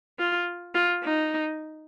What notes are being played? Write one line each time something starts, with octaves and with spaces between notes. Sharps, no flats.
F4
F4
D#4